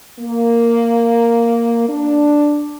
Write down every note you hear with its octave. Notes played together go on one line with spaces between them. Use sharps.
A#3
D4